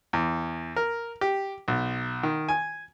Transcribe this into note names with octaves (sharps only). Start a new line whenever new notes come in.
E2
A#4
G4
B1
D#3
G#5